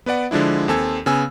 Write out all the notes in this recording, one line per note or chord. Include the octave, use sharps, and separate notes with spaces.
B3 B4 D5 F#5
D3 F3 G#3 D4 E4
D#2 C4 A4 G#5 E6 G#6
C#3 B3 G#5 E6